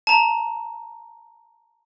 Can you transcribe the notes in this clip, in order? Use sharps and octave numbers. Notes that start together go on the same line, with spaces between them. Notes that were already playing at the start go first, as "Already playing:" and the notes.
A5 A#5